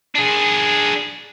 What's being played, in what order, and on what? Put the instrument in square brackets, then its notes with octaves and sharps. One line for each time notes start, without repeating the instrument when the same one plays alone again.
[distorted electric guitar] D4 G#4